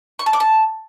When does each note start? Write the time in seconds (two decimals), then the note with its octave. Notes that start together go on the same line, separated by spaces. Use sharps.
0.19 C#6
0.26 A5
0.33 D6
0.40 A5